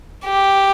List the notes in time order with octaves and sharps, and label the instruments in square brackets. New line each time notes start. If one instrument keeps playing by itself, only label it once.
[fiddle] G4